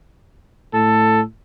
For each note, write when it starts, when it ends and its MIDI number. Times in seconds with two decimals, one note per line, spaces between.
0.73 1.22 45
0.73 1.21 69